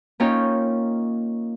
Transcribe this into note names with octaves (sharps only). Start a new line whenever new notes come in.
A#3 C#4 D#4 F4 C#5 G5